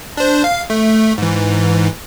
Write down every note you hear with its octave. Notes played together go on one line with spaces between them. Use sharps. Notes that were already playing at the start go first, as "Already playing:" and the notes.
D4 C5
F5
A3
G#2 E3